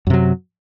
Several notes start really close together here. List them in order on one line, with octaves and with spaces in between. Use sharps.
F#2 C3 F#3